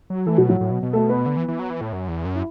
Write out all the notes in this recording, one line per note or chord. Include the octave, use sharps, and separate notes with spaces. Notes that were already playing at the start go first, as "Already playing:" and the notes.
F#3
E3 A3 A4
B2 F#3 F#4
A2 F#3 F#4
A2
B2
B2
A3 A4
B3 B4
D3
E3
E3
F#3
E3
A2
F#2
E2
F#2
E4